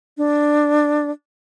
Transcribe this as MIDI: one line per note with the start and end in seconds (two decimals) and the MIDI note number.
0.18 1.11 62